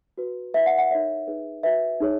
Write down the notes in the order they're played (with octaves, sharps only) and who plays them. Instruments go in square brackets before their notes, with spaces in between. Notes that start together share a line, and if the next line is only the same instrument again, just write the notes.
[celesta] F#4 B4
E4 B4 E5
F#5
F#5
D#4 A#4 C#5 E5
D#4 G#4 B4
F#4 B4 E5
D#4 G#4 C#5